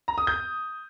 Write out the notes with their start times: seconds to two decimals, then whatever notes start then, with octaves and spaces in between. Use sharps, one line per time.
0.08 A#5
0.18 D#6
0.27 G6